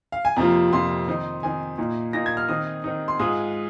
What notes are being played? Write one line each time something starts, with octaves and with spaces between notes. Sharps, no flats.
F5
G#5
F2 C3 F3 A#3 F4 A#5
F2 C3 F3 A#3 F4 C6
D#3 C4 D#4
D#3 C4 D#4 G#5
A#2 A#3 D#4
A#2 A#3 D#4 A#6
G#6
F6
D#3 C4 D#4 D#6
D#3 C4 D#4
C6
G#2 G#3 F4 D#6